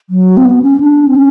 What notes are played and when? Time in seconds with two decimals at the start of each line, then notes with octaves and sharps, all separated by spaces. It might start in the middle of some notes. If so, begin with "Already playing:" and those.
0.10 F#3
0.37 C4
0.45 B3
0.62 C#4
0.80 D4
1.08 C4
1.15 C#4